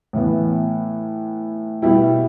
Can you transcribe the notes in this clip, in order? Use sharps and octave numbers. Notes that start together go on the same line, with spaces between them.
A2 E3 B3
B2 G3 B3 E4 G4